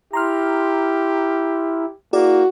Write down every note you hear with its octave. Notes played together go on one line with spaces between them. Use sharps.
E4 G4 A#5 C6 F6
A#3 E4 F#4 G#4 D5